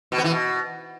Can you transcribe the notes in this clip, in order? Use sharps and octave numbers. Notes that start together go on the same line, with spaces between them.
B2
B3
E3
B2